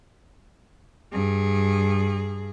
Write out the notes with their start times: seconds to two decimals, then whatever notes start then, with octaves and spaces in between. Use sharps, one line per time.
1.12 G2 G#4